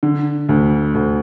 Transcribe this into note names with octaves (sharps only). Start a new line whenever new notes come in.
D3
D2
D2